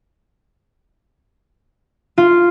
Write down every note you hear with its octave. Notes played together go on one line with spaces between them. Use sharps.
F4